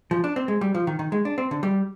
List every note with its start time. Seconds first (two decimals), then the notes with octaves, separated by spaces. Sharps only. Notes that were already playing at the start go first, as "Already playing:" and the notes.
0.11 F3
0.24 D4
0.36 C4
0.48 G#3
0.61 G3
0.74 F3
0.87 D#3
0.99 D#3
1.12 G#3
1.25 D4
1.38 C4
1.51 D3
1.63 G3